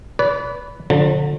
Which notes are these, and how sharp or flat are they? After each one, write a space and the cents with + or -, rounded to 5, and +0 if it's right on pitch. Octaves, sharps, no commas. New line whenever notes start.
B4 +0 D5 -40
D3 +0 F3 +40 A#5 -40